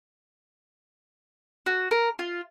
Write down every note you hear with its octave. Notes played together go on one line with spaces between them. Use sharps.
F#4
A#4
F4